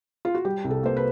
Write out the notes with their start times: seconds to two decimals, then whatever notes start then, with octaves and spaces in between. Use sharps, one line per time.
0.25 F4
0.35 F#4
0.45 G3 G4
0.64 C2
0.70 A4
0.83 A#3 C5
0.97 B4